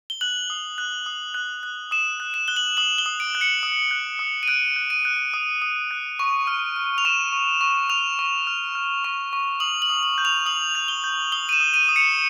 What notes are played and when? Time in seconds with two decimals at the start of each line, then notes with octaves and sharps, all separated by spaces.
0.10 G7
0.21 F#6 F#7
0.50 D#6
0.78 F#6
1.06 D#6
1.34 F#6
1.63 F#6
1.91 D#6 E7
2.20 F#6
2.34 E7
2.48 F#6 G7
2.56 F#7
2.77 D#6 F#7
2.98 G7
3.06 D#6
3.20 D7
3.35 F#6
3.41 C#7
3.63 D#6
3.91 F#6
4.19 D#6
4.43 D#7
4.48 F#6 D7
4.76 F#6
4.90 D#7
5.05 F#6
5.34 D#6
5.62 D#6
5.91 F#6
6.19 C#6
6.47 F6
6.76 F6
6.98 F7
7.05 C#6 E7
7.32 C#6
7.61 C#6
7.90 F6 F7
8.19 C#6
8.47 F6
8.75 F6
9.04 C#6
9.33 C#6
9.60 D#6 F#7
9.82 F#7
9.90 D#6
10.03 F#7
10.18 G6
10.25 F7
10.46 D#6 F#7
10.75 G6
10.88 G7
11.04 G6
11.32 D#6 G7
11.49 D#7
11.53 E7
11.60 D#6
11.74 D#7
11.89 D#6
11.96 C#7